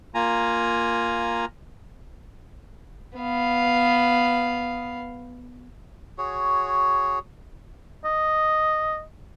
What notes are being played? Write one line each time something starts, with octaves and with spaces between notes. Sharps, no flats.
A#3 F4 G#5 A#5
B3 F5
F#4 G#4 C#5
D#5